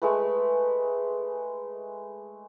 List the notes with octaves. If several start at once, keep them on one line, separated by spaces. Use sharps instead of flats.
G#3 A3 B4